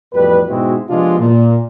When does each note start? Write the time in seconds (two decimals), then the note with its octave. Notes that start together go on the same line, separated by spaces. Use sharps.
0.13 A1 F2 B2 G3 B4
0.48 G#2 B2 G#3 C4 E4 F#4
0.90 C3 F3 G#3 B3 D4 F4
1.19 A#2